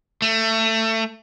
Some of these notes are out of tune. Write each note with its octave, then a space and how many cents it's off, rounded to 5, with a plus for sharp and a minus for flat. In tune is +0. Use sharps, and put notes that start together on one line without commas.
A3 +20